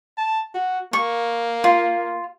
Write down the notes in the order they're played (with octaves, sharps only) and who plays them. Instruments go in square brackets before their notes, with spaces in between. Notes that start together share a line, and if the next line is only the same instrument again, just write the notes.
[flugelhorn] A5
F#4
[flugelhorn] A#3 [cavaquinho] C#6
[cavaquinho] F4